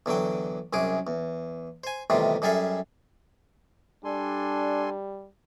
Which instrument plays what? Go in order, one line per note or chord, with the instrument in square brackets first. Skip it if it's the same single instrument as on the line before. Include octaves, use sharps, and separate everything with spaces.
[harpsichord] E2 D3 F#3 G5
C2 F#2 G#4 D6
E2
C5 G#5
E2 A2 C3 D#3 G3 F4
F#2 G3 G#4 A4 E5 F5
[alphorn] G3 [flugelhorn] D4 [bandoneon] A4 G#5 C6